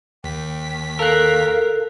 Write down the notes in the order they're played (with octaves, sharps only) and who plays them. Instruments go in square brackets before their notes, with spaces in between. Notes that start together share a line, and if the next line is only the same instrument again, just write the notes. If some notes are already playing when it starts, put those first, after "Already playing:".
[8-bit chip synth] D#2 B6 [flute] G5
[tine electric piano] A4 F#6 [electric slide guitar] A#4 [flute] F5